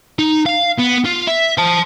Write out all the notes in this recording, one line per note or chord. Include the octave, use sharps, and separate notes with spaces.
D#4
F5
B3
F4
E5
C5 A5